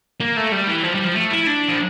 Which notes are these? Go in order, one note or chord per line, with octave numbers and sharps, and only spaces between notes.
A#3
A3
G3
E3
F3
G3
F3
A3
E4
D4
F3